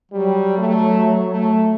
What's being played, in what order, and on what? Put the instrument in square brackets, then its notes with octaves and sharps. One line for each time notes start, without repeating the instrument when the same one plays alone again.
[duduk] F#3 [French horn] G3
[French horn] A3
A3